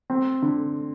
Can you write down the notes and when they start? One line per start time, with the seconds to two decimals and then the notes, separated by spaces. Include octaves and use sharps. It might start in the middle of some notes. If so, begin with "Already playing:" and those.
0.10 C4
0.42 D3